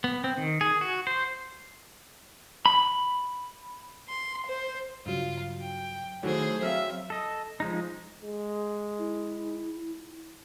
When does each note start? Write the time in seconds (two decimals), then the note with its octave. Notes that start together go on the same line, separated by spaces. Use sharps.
0.04 B3
0.24 C4
0.38 D#3
0.61 G#4
0.81 F#4
1.07 C5
2.66 B5
4.09 C6
4.47 C5
5.06 G2 C#3 F#3 F4
5.61 G5
6.23 D#3 F#3 A3 E4 F#4 G#4 C5 C#5
6.63 F#3 C4 E5 F5 E6 F6
7.10 A4 D#5
7.60 F3 G#3 D#4
8.22 G#3
8.99 E4